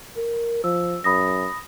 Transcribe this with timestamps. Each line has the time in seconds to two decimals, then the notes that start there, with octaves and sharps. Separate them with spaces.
0.17 A#4
0.64 F3 E6
1.04 F#2 B5 D#6 A#6